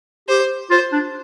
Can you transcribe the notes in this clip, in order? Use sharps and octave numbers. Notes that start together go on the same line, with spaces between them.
G4 C5
F4 C5
D4